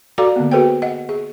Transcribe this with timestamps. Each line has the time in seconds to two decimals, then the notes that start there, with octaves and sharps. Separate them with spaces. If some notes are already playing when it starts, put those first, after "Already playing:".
0.18 F#4 A4 D5 F5 A#5 D6
0.36 D3 A#3 B3
0.51 F#4 G#4 A4 B4 C5 G5
0.82 D#5 F#5
1.09 G#4